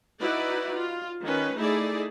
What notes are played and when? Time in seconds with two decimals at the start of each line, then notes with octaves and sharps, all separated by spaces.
0.20 D#4 E4 F#4 B4 D5
0.75 F4
1.24 D#3 C#4 B4
1.57 A3 D#4 E4 G#4 D5